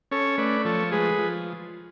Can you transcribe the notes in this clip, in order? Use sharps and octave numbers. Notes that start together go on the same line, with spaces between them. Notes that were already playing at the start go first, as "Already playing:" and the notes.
C#4 A4 C#5
A3 B4 D5
F3 A4 C#5
G#3 G#4 B4
F3